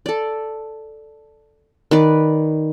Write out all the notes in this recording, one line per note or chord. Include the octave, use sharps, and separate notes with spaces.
A4 D5
D#3 B4 D5